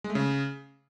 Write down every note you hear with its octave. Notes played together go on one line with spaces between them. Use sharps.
G#3
A3
C#3